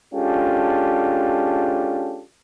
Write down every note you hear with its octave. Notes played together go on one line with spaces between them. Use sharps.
G#3 C#4 D4 F4 G4 A4